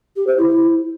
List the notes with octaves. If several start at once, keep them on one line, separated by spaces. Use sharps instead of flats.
G4
C5
E4